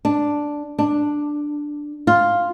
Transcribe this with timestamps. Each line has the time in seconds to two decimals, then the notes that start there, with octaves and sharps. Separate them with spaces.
0.05 D4
0.79 D4
2.07 F4